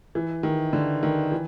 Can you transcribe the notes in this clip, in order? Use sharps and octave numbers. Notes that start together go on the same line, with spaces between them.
E3
D#3
D3
D#3
E3